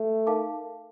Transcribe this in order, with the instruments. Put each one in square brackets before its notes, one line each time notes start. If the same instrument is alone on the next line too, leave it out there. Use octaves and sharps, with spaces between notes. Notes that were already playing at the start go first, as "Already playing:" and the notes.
Already playing: [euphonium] A3
[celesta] D#4 A#4 F5 A5 D6